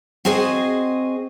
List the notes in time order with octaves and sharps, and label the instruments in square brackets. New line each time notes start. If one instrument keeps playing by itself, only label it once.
[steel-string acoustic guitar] C4 F#4 G#4 C5 D#5